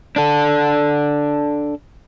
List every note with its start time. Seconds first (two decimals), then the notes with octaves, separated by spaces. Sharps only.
0.16 D4 A4